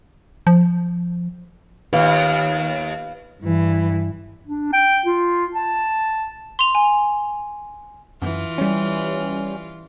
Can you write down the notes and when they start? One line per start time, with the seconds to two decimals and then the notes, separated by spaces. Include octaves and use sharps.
0.47 F3
1.93 D#2 B4 F5
3.42 G2 E3
4.47 D4
4.73 G5
5.06 F4
5.54 A5
6.59 C6 F7
6.75 G#5
8.22 F#2 E3 F4
8.58 G3 C#4